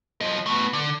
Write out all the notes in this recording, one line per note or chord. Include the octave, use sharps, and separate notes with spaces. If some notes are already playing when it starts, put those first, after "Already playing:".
F3 D#5
A3 B3
D3